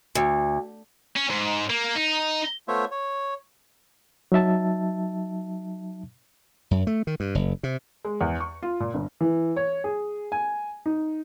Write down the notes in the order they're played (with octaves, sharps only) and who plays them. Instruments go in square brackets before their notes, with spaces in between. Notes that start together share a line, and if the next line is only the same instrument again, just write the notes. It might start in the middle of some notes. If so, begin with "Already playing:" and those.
[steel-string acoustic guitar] D2
[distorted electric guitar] C#4
G#2
A#3
D#4
[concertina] A3 B3 F4 C5 C#5 E5
C#5
[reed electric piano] F#3 D#4 E5 A5
[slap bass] F#2
A3
D#3
G2
F#1
C3
[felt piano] G#3
E2
C#6
F4
A#2
G1
[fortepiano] E3
C#5
G#4
G#5
D#4